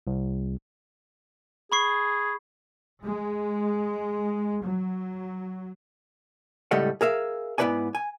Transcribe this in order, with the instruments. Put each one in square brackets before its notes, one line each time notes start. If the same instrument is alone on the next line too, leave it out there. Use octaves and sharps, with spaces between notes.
[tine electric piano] C2
[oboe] G#4 [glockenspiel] B5 C#6 C7
[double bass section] G#3
F#3
[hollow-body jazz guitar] C#2 A2 G3 A3 D#5 F#5
G#4 A#4 E5 F5
G#2 B3 E4 B4 D5 G#5
G#5